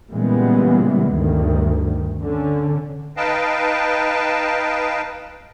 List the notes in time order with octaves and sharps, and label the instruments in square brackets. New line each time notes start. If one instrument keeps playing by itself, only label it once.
[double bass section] A#2 C#3 E3 G3 G#3 B3
D2 G2 D#3
D3 C#4
[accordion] D#4 B4 D#5 F5 G5 A5